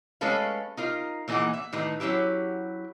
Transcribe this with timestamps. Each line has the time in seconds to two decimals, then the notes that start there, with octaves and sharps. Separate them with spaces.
0.21 G#3 A3 C#4 A4 B4 F5
0.77 D#4 F4 A#4
1.28 A#2 E3 A#3 D#4 G#4 F#5
1.54 E5
1.73 A2 D#3 D#4 B4
2.00 F#3 A3 C#4 E4 G4